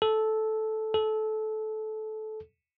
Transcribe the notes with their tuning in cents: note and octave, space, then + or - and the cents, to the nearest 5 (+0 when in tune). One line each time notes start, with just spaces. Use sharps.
A4 -10
A4 -20